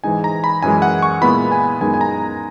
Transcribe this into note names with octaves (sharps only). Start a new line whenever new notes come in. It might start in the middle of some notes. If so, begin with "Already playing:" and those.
G#2 E3 G#3 D#4 G#5
A#5
B5
F#2 E3 G#3 G#5
F#5
C#6
A#2 G#3 B3 E4 B5
G#5
F#2 D#3 G#3 B3 D#4 G#5
G#5
A#5